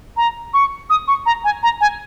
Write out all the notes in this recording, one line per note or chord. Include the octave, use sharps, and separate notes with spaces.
A#5
C#6
D#6
C#6
A#5
G#5
A#5
G#5